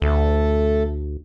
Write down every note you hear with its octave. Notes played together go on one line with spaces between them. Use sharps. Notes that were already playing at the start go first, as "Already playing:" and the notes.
D2 A3 A4